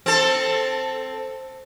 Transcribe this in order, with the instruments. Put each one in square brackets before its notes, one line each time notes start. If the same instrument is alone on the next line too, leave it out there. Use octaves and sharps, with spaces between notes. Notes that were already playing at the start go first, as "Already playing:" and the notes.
[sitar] C4 A4